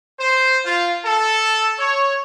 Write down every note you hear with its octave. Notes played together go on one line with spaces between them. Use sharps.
C5
F4
A4
C#5